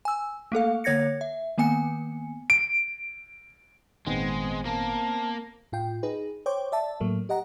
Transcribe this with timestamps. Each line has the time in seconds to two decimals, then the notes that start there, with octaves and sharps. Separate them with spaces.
0.05 G#5 E6
0.52 A3 A#3 A4 F5
0.84 D3 A#3 C#5 G#6 A#6 C#7
1.21 E5
1.58 D#3 A#3 B3 G#5 C#7
2.50 D7
4.06 G#1 A#2 D#3 G#3 B3 C4 C5
4.65 A#3 A5
5.72 A2 F4 G5
6.03 D#4 G#4 B4
6.46 C5 C#5 G5 D6
6.72 D5 E5 A5
7.00 A2 F#3 A3 A#3
7.29 G4 D#5 F#5 A#5